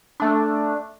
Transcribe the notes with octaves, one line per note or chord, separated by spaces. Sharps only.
A3 D4